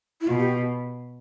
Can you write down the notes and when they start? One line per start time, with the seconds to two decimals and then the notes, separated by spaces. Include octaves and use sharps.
0.21 E4
0.27 B2 F4
0.39 G4